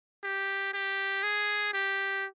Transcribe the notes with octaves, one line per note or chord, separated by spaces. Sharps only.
G4
G4
G#4
G4